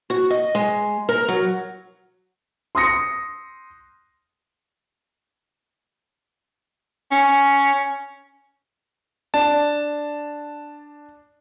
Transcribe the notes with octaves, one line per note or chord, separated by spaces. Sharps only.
F#4
D#5
G#3
A#4
F#3
C6 D#6 A#6 C#7
C#4
D4 A5